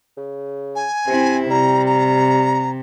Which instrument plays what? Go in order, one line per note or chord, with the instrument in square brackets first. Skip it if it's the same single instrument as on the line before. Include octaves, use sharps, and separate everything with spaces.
[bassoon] C#3
[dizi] G#5
[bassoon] C3 [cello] C4 E4
[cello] C3 [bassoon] G3 [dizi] A#5
[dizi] A#5